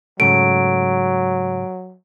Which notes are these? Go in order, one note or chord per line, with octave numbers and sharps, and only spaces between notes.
G#2 C#3 F#3 A3 D7